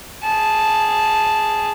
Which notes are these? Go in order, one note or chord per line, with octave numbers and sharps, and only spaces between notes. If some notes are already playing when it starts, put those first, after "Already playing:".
G#4 A5